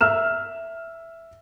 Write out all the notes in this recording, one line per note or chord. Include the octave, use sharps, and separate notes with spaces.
E5 E6 F6 E7